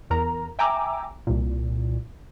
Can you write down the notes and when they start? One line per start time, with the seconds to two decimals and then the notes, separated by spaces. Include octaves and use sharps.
0.10 E2 A#4 A#5
0.59 E5 G5 G#5 A#5 D6 E6
1.27 C2 A#2